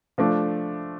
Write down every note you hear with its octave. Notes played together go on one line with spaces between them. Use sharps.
F3 A3 D4